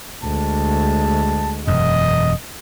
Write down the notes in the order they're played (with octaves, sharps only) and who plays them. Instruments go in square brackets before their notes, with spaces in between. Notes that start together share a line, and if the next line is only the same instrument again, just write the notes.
[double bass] D2 G#3 [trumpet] A5
[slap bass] E1 F#2 [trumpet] D#5